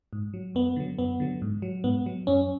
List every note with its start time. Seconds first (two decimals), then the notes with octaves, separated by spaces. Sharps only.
0.13 G#2
0.34 F#3
0.55 F#2 B3
0.76 D3 F#3
0.99 F#2 B3
1.20 D3 F#3
1.42 G#2
1.62 F#3
1.84 G#2 B3
2.06 F#3
2.27 F#2 C#4